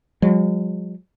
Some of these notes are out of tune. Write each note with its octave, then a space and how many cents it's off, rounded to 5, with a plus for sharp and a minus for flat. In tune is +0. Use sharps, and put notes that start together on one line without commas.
F3 +45 G#3 -40